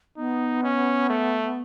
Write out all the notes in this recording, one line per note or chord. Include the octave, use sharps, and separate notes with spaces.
B3 D#4
C#4
A3